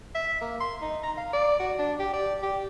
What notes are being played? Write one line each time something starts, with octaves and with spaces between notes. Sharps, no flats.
E5
A#3
C6
D#4
A#5
F5
D5
F#4
D4
G4
D5
G4